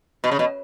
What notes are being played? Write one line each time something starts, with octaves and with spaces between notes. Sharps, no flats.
B2
C#3
B2